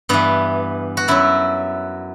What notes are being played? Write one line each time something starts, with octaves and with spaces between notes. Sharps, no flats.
G2 E3 B3
F#4
F#2 F#3 E4